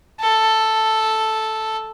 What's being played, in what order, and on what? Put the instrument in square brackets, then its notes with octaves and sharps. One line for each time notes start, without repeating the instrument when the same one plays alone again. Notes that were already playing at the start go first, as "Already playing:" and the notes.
[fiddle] A4